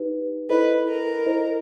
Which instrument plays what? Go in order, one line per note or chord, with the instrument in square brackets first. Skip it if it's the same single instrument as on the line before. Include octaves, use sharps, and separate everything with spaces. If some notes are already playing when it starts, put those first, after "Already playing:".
Already playing: [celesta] D#4 G4 B4
[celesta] E4 A4 C5 D#5 [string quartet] B4
[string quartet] A#4
[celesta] E4 A4 C5 D#5